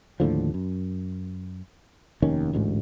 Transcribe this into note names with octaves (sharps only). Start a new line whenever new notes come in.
D#2 A2 D3 F3
F#2
F1 D#2 D#3 C#4
A1 D2 G#2